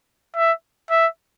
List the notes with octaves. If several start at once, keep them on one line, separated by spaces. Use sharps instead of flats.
E5
E5